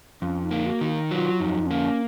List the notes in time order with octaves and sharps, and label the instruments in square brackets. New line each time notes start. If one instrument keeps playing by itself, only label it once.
[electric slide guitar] F2 [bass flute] C#4
[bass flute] D#4
[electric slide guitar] A#3
[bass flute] F#4
[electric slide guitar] D#3
[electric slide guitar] F#3 [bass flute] F4
[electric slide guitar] F2 [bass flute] D#4
[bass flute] C4
[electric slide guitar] A#3 [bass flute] C#4